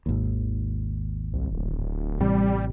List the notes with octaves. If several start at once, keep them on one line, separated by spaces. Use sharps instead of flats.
G#1 D#2
C2
D1
A1 C3 G3